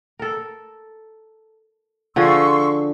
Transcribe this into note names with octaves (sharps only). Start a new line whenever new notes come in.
A4 A#4
D3 F3 G#4 C6 C#6 E6